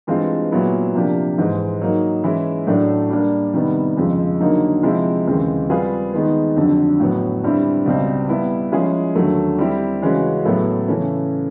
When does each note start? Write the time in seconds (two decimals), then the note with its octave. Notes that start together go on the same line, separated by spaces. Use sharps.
0.07 G2 E3 G#3 C4 F4
0.52 A#2 F#3 B3 E4
0.95 C3 F3 A#3 D4 G4
1.38 G#2 E3 G#3
1.81 F#3 A#3 D#4
2.24 E3 G#3 C#4 E4
2.67 A2 F#3 A3 D4
3.10 G3 A#3 D4
3.54 C3 D#3 G3 B3
3.97 F2 C#3 F3 G#3
4.40 D3 F#3 A#3 D#4
4.83 C3 F3 G#3 C4 E4
5.27 D#2 C#3 E3 G#3 C4
5.69 G3 C4 F4 G#4 B4
6.13 D#3 G#3 B3
6.56 F2 D3 F#3
7.00 A2 F#3 B3
7.43 G2 D3 G3 C4 E4
7.85 C#2 B2 G3 C4
8.29 G3 B3 E4
8.72 F3 G#3 C#4 E4 G#4
9.15 D#2 D3 F#3 A3
9.58 G3 C4 E4 G4
10.02 C#3 E3 G#3 C#4 F#4
10.45 A2 F#3 B3 E4 A4
10.88 C#3 E3 A3 C#4